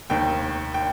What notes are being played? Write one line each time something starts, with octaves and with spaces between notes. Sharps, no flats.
F1 D#2 D#3 G5
G5